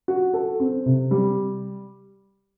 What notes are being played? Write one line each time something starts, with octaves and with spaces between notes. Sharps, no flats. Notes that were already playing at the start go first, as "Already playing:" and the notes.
F#4
A4
C4
C3
G3